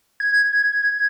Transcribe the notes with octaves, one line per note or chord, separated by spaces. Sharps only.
G#6